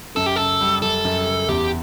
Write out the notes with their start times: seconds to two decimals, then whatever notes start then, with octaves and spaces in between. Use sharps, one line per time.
0.16 F#2 A4
0.26 G4
0.36 C#3 A4
0.61 G3
0.82 F#2 A4
1.05 F#2
1.26 C#3
1.48 E2 G4